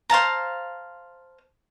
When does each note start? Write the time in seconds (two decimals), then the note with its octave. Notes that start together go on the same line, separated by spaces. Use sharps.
0.10 C5 F5 A5 A#5